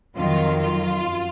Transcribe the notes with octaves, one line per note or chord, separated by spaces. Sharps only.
F2 D#3 F#3 F4
F4
F#2